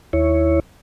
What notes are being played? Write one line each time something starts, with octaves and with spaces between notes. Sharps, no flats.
D#2 E4 C#5